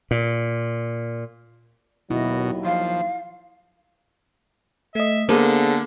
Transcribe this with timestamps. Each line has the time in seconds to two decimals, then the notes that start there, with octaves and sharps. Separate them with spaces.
0.11 A#2
2.10 D#2 B2 F#3 E4 D#5
2.65 F3 F5
4.95 A3 D#5 E5
5.29 D3 A#3 B3 G#4 A4 C5